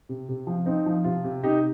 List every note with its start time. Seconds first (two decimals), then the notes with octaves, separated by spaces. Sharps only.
0.09 C3
0.29 C3
0.47 F3
0.66 C4 D#4
0.86 F3
1.04 C3 F4
1.24 C3
1.43 C3 D#4 G4